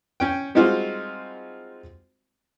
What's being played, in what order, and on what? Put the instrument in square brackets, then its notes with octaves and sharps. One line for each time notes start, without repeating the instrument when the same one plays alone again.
[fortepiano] C#4 G5
G3 G#3 C4 D#4 F4 F#4